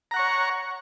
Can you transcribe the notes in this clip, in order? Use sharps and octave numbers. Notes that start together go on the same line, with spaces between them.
C#5 F#5 A#5 C#6